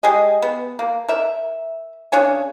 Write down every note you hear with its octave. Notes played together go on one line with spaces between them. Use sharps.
G#3 G4 G#4 D#5
B3
A#3
A#4 E5
C#3 D4 C#5 G#5